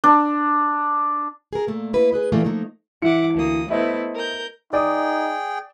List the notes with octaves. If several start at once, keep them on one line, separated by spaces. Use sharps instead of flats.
D4
G#4 A#4
A#2 A3 A#3
A#3 E4 B4
G#4 B4 D#5
A#2 E3 A3 A#3
F3 A3 A#3 D#4
E3 E5 F#5 D6 C#7
D2 A#3 D#6
A3 B3 E4 C5 D#5 E5
A#4 G6
D#4 G#4 D5 G5 D#6